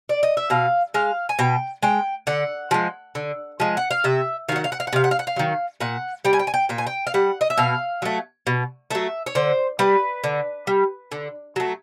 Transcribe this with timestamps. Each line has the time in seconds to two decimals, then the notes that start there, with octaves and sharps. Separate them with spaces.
0.09 D5
0.23 D#5
0.37 E5
0.50 B2 F5
0.94 G#3 F5
1.29 G#5
1.39 B2 G5
1.83 G#3 G5
2.27 D3 F#5
2.71 F3 G#3
3.15 D3
3.60 F3 G#3
3.77 F#5
3.91 F5
4.04 C3 E5
4.49 D#3 F5
4.52 F#3 F#5
4.64 F5
4.72 F#5
4.80 F5
4.87 F#5
4.93 C3 F5
5.04 F#5
5.11 F5
5.19 F#5
5.27 F5
5.36 D#3 F#3
5.81 A#2 F#5
6.25 G3 G5
6.33 G#5
6.39 G5
6.47 G#5
6.54 G5
6.69 A#2 G5
6.78 G#5
6.87 G5
7.07 F5
7.14 G3 F#5
7.41 D#5
7.50 E5
7.57 B2 F5
8.02 F#3 A3
8.47 B2
8.91 F#3 A3 E5
9.26 C#5
9.35 D3 C5
9.79 G3 B4
10.24 D3
10.67 G3
11.12 D3
11.56 F#3 A3